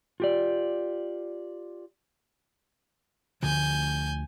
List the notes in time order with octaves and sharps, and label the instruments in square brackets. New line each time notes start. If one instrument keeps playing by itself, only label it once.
[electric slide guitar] F4 G4 D5
[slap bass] D2 D3 F3 [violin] G#5 G6